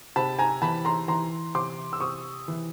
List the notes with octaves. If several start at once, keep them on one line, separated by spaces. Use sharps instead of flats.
C3 A5 B5
G#5 A#5
E3 A5 B5
A#5 C6
E3 A#5 C6
C3 C6 D6
E6
C3 C#6 D#6
E3